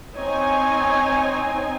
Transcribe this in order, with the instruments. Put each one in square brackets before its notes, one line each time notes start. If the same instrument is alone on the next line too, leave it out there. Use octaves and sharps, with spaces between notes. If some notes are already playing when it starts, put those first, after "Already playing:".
[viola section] C4 D#4 G#5 [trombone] C#5